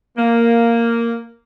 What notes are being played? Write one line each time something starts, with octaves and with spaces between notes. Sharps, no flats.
A#3